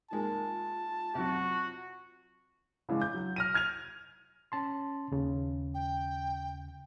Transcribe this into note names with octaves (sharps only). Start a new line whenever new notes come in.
D#3 G#3 A#3 F4 A5
C3 F#3 F#4
C#3 E3 G#3 D4
G6
F#3
F6 A#6 D#7
F6 G#6 D#7 F7
C#4 A5 C6
D#2 C#3
G5